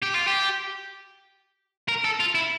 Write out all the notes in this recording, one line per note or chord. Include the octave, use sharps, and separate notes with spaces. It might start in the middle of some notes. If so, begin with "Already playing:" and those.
G4
F4
G4
A#4
A4
F4
E4